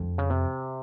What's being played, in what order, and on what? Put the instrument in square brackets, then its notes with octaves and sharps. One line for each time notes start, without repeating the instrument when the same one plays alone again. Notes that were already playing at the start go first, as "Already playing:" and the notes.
Already playing: [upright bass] F2
[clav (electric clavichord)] C#3
C3